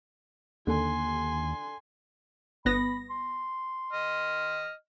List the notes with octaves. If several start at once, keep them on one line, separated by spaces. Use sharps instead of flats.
D#2 D3 G#5 C6
G1 B3 B5 A#6
C6
D#5 F6